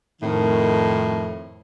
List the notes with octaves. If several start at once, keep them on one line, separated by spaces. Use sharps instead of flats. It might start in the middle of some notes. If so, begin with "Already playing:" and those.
F2 A2 D#3